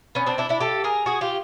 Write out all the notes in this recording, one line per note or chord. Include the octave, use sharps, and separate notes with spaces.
B3 C#4
C4 D4
D4 E4
D4 E4
G4 A4
G#4 A#4
F#4 G#4
F4 G4